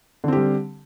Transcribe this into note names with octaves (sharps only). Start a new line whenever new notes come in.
D3 G3 C4 G4